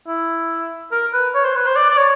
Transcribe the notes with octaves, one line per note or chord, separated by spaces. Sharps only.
E4
A#4
B4
C#5
C5
B4
C5
D5
D5
C#5